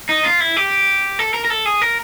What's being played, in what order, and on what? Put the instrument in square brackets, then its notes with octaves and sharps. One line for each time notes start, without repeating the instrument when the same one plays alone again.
[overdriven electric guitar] D#4
F4
E4
G4
A4
A#4
A#4
A4
G#4
A#4